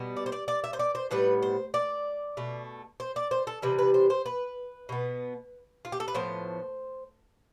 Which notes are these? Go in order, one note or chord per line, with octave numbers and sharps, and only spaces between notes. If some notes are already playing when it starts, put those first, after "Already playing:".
Already playing: B2 G3 B3
D5
C5
D5
D5
E5
C5
D5
C5
A2 G3 B3 B4
C5
D5
B2 A3
C5
D5
C5
A4
C3 E3 G3 B4
B4
C5
C5
B4
B2 B3
F4
G4
A4
B4
A2 F3 B3 C5